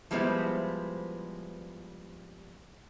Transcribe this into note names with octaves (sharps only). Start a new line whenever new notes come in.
F3 G3 G#3 B3 E4 C5